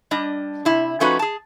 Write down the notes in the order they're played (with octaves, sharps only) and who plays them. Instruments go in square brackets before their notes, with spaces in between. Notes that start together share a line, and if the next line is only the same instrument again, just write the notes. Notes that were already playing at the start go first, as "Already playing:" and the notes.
[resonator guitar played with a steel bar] G3 D4 D#5
C3 E4
F3 A3 C#4 D#4 F#4 B4
G#4 A5